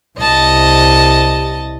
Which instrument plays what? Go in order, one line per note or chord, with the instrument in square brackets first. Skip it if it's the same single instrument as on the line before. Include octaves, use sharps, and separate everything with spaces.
[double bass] C2 [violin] D#5 A5